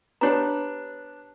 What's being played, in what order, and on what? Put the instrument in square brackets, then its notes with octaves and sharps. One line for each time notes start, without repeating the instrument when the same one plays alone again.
[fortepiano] B3 D4 [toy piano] G4 C#5 A#5